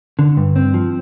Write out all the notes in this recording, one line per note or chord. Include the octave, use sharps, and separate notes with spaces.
D3
G2
C4
F3